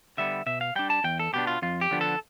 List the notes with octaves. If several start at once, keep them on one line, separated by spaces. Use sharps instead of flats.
D3 G3 B3 E5
B2 E5
F5
G3 D4 G5
A5
E2 G5
A4
B2 B3 D4 G4
F4
F2 F4
G4
D3 F3 B3 D4
A4